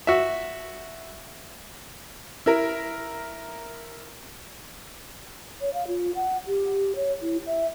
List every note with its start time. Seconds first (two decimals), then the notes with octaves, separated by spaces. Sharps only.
0.07 F#4 E5
2.46 E4 A#4
5.61 C#5
5.74 F5
5.87 F4
6.15 F#5
6.48 G4
6.96 C#5
7.22 E4
7.47 E5